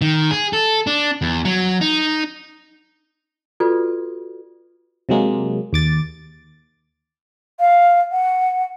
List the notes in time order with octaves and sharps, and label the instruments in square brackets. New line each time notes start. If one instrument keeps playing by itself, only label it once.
[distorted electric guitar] D#3
G#4
A4
D4
E2
F#3
D#4
[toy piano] F4 F#4 A4 B4 D5
[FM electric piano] C3 F#3 G#3 A#3
D#2 D6 A6
[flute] F5
F#5